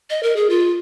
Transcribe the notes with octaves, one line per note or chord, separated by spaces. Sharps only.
D#5
A#4
G#4
F4